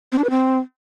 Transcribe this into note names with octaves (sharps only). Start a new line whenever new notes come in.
C4
D4
B4
C4